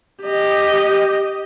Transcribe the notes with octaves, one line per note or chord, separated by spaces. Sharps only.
G4 D#5